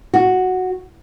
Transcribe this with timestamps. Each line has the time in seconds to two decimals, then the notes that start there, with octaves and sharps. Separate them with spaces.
0.14 F#4